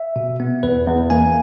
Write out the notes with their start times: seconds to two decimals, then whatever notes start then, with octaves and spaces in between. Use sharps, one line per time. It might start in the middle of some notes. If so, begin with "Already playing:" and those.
Already playing: E5
0.16 B2
0.40 B3
0.63 E2 B4
0.87 E2
1.10 A#3 G#5